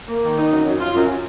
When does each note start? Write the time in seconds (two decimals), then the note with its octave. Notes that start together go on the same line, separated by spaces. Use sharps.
0.08 A#3
0.23 D#3
0.37 D#4
0.52 F#2
0.66 F#2
0.79 F4
0.94 F#2